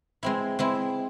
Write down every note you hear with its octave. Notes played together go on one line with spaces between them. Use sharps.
G#3 C4 E4
G#3 C4 E4